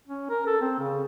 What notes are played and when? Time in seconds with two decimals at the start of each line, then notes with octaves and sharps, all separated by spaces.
0.08 C#4
0.30 A#4
0.47 A4
0.61 C4
0.79 C#3